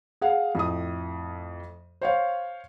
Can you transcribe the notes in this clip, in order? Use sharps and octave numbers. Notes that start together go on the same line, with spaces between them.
G#4 F5 F#5
F2 A2 D#6
C5 C#5 F5